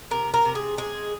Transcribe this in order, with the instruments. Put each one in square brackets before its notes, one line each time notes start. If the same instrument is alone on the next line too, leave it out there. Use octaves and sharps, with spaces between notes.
[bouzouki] C3 A#4
A#4
C3
G#4
G#3 G#4